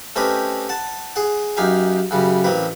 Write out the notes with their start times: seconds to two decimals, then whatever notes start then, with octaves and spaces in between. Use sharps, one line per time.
0.16 A3 C4 C#4 G4 B4 D#5
0.69 F#5 A5
1.16 G#4 F#5
1.57 F#2 D#4 G4 F5 G#5
2.11 F#2 C#3 G3
2.44 A1 A#3 C4 B4